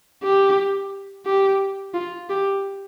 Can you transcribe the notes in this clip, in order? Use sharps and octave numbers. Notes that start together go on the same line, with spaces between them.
G4
G4
F4
G4